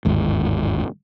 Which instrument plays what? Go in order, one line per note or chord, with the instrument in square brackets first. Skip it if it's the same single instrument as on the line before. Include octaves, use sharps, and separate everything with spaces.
[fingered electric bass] G1 D#2 G#2